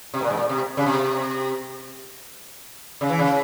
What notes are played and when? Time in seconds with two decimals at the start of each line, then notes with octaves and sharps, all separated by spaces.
0.14 C3
0.22 A#2
0.30 G#2
0.37 A#2
0.49 C3
0.77 C#3
0.86 C3
3.01 C#3
3.09 E3
3.19 C#3